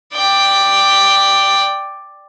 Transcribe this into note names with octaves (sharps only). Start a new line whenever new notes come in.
D5 G5